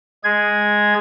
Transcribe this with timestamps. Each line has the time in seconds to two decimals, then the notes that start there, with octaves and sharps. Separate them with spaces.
0.24 G#3 G#4 G#6